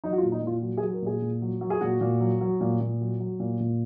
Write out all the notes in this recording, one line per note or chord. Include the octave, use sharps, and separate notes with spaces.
F#3 D#4
F#4
F4
A#2
D#4
A#2 F4
F#3 F#4
G#4
F#3
A#4
A#2 G#4
A#2
F#3
F#3
G#4
A#2 F#4
A#2
F#3
F#3
A#2
A#2
F#3
F#3
A#2
A#2